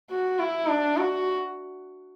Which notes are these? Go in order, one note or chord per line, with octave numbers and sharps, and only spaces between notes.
F#4
E4
D4
F#4